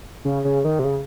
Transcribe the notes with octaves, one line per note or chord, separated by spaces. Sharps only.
C#3
C#3
D#3
C3
C#3